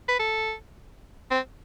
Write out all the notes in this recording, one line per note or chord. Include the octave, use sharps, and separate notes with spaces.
B4
A4
C4